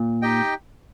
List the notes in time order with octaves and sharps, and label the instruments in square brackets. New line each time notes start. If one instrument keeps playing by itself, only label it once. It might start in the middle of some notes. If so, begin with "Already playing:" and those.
Already playing: [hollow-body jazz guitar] A#2
[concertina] D#4 G4 D#5 G5